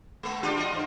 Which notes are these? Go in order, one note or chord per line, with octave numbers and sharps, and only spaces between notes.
G#3 A#3 B3
D4 F4 G4
F4 D#5
G2